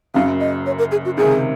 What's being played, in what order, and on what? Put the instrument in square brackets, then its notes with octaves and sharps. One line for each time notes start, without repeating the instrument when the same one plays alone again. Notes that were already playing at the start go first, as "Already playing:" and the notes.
[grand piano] F#1 F#2 C#3 [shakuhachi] F5
[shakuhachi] D#5
C#5
A#4
G#4
F#4
[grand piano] C#2 C3 D#3 [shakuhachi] G#4